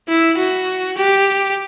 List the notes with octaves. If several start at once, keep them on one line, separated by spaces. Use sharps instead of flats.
E4
F#4
G4